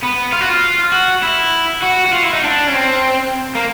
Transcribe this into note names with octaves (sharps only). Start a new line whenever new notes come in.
B3
F4
F#4
F4
F#4
E4
F#4
F#4
F4
E4
D#4
D4
C#4
C4
A#3